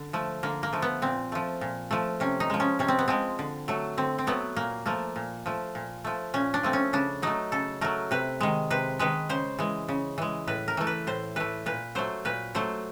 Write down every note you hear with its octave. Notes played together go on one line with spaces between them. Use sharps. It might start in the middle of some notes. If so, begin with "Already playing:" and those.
Already playing: D3
F3 A3
D3 A#3
A#3
F3 A3
B3
A#2 C4
F3 A3
A#2
F3 A3
C3 C#4
D#4
F3 G#3
C#4
C3 C#4
C4
B3
F3 G#3 C4
D3
F#3 A3
D3 C4
C4
F#3 A3 B3
A#2 A#3
F3 A3 A#3
A#2
F3 A3
A#2
F3 A3
A#2 C#4
D4
F3 A3 C4
C#4
C#3 D4
F#3 A3 D#4
C#3 A4
F#3 A3 A#4
C3 B4
D#3 G#3
C3 B4
D#3 G#3 B4
C#3 C5
E3 G#3
C#3
E3 G#3
A2 B4
A#4
E3 A3
B4
A2 C5
E3 A3 B4
A#2 B4
F#3 A3 C5
A#2 B4
F#3 A3 C5